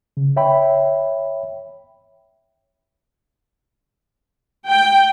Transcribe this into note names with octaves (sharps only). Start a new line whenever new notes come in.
C#3
C#5 E5 G5 B5
G5